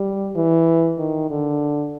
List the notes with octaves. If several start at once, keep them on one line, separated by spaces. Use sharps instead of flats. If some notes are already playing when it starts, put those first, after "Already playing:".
Already playing: G3
E3
D#3
D3